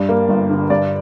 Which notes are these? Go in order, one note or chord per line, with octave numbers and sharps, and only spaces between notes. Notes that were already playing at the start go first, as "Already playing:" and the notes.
Already playing: G2 G3 D5
A#3
G1
D3
G2 D5